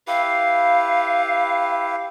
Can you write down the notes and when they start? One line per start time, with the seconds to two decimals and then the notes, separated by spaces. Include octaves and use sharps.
0.07 E4 G4 B4 F5